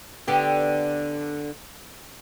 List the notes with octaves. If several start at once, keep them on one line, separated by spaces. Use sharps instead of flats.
D3 B3 G4